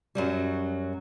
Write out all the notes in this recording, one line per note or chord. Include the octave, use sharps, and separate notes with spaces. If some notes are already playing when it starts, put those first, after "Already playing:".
F#2 F#3 G3